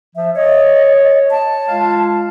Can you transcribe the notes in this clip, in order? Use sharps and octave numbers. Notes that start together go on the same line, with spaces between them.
F3 E5
C#5 D#5
A5
G#3 F4 F5